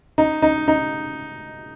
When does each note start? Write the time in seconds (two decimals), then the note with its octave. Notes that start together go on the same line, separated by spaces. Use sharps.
0.18 D#4
0.42 D#4
0.68 D#4